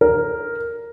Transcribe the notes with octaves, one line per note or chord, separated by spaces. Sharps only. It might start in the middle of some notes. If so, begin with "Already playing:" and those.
A#4